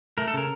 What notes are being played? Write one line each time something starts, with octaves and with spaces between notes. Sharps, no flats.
A3 A#4
A4
C#3 A#4